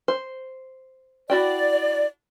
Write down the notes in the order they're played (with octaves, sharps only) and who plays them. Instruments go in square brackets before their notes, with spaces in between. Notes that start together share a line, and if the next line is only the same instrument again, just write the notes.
[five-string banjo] C5
[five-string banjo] E4 F#4 G5 [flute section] D5